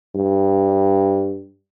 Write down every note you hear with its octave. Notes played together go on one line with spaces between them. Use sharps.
G2